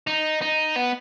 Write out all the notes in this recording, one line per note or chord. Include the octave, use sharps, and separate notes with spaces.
D#4
D#4
B3